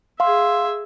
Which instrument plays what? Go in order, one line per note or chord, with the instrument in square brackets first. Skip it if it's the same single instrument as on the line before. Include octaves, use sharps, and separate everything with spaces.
[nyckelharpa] G#4 E5 [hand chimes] F5 C6